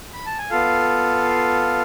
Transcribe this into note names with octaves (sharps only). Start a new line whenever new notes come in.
B5
A5
G#5
B3 F4 A4 F5